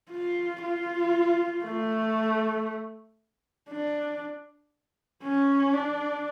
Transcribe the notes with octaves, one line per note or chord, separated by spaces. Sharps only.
F4
F4
A3
D4
C#4
D4